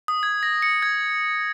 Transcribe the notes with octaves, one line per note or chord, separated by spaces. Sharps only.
D#6
G#6
A#6
C#7
G#6